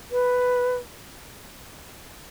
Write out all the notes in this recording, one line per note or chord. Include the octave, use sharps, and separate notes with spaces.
B4